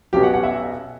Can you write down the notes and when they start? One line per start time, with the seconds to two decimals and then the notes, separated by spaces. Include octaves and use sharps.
0.13 B1 B2 F#3 C#4 G4
0.23 F#5
0.34 F#5
0.43 E5